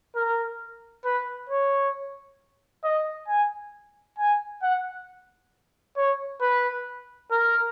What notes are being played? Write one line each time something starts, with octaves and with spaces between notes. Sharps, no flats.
A#4
B4
C#5
D#5
G#5
G#5
F#5
C#5
B4
A#4